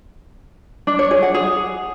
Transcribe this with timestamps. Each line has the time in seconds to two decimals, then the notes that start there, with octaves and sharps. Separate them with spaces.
0.87 D4
0.99 C#5
1.11 G#4
1.23 F#5
1.34 G#4